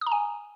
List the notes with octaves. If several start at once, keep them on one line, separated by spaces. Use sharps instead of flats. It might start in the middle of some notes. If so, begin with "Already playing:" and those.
D#6
A#5
G#5